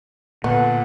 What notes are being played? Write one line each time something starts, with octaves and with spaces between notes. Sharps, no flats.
A#2 D3 B3